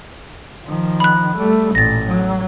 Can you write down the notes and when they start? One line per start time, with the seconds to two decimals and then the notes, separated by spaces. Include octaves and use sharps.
0.65 D#3 F3
1.00 B5 F#6
1.37 G3 A3
1.75 A1 A#2 A6 A#6
2.05 F#3